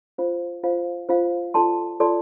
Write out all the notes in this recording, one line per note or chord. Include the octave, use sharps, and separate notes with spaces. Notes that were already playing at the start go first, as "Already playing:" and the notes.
F4 C5 F5
F4 C5 F5
F4 C5 F5
F4 A4 D5 A5 C6
F4 A4 D5 A5 C6